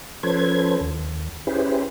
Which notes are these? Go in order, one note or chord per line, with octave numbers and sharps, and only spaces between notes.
F3 C#4 A4 B4 C5 G#6
D#2
C#4 E4 G4 G#4 B4 C5